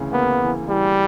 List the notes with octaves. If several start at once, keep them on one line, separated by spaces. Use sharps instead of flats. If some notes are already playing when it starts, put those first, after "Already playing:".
Already playing: D2 C#3 E3
A#3 B3
E3
E3 G3